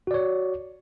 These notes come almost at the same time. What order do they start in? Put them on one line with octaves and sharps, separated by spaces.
F#4 D5 C#5